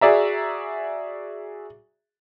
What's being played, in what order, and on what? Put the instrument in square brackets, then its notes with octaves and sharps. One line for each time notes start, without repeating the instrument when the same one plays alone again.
[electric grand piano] F#4 G#4 D5 E5 A#5